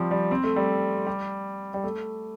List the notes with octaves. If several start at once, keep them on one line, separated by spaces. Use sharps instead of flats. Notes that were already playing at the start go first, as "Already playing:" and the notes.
Already playing: F3 G3 C4
G3
C4
A3
G3
G3
G3
A3